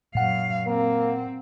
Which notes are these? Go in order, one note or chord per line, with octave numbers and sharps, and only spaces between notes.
F#2 A#2 F5 F#5
A#3 C4